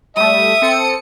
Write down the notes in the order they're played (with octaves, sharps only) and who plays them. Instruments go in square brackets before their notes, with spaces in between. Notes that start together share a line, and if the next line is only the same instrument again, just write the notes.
[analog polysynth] G3 A3 [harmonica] E5 [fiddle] D#6
[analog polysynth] C4 A4 C#7